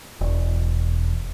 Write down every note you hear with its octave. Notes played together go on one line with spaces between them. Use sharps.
E1